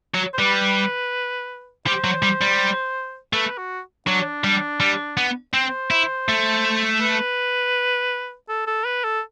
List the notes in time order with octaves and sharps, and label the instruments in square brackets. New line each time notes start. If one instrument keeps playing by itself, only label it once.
[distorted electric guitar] F#3
[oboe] C5
[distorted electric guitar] G3 [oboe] B4
[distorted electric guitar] G3 [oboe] C5
[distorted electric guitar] F#3
G3
G3
[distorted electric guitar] A3 [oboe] B4
[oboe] F#4
[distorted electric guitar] F#3 [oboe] D4
[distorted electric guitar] G3
G3
B3
[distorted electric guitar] C4 [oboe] C5
[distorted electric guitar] E4
A3
[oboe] B4
A4
A4
B4
A4